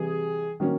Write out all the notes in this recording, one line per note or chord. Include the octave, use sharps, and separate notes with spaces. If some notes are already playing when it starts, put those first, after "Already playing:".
Already playing: C3 E3 G3 G#4
D#3 F#3 A#3 C#4